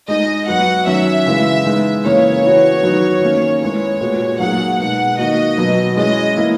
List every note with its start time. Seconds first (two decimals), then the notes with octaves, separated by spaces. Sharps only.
0.08 G#3 D#4 G#4 D#5
0.47 F#3 B3 F#4 F#5
0.87 D#3 F#3 C#4 E5
1.26 C#3 E3 G#3
1.65 G#3 B3 D#4
2.04 C#3 E3 A#3 C#4 G#4 C#5
2.43 E3 B3 F#4
2.83 D#3 F#3 B3 D#4 F#4
3.22 D#3 A#3 C#4
3.61 G#3 B3 E4 G#4 C#5
4.01 A#2 G#3 B3 F#4
4.39 F#3 A#3 D#4 G#4 F#5
4.79 B2 G#3 D#4 F#5
5.18 D#3 A#3 D#4 F#4 D#5
5.57 B2 F#3 B3
5.97 G#3 C#4 E4 G#4 D#5
6.36 E3 A#3 E4